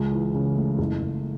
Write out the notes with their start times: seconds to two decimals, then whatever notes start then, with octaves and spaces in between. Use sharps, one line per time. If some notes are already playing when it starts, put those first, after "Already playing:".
Already playing: C#2
0.11 E3
0.35 C#3
0.56 A3
0.78 F#1
1.02 F#1